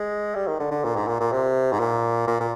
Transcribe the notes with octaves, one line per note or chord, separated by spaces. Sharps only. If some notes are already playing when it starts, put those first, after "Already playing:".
Already playing: G#3
G3
D#3
D3
D3
A#2
G#2
A#2
A#2
C3
G#2
A#2
A#2
A#2